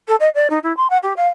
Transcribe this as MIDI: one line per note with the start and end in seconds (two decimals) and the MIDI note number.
0.08 0.15 69
0.20 0.29 75
0.35 0.47 74
0.50 0.58 63
0.63 0.75 64
0.77 0.87 84
0.90 0.98 78
1.03 1.13 67
1.16 1.27 77